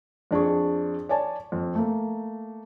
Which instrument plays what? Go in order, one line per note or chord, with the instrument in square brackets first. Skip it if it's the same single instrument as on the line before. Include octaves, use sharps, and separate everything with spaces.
[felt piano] F2 D4 G#4 C#6
C#5 D5 G#5 A5
F2
A3 A#3